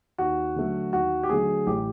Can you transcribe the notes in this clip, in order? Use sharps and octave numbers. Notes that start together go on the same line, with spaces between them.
D#2 F#4
D3 F#3 A3
D#2 F#4
G4
D3 F#3 A3 G#4
A1 G4